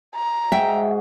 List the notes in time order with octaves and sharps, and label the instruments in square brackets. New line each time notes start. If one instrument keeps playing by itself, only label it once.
[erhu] A#5
[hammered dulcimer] G#2 F#4 G#4 [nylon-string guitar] E5 G5